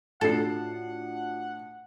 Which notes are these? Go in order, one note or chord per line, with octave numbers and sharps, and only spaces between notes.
A2 D4 F4 F#4 A4 F#5 C7